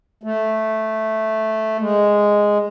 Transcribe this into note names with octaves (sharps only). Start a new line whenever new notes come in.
A3
G#3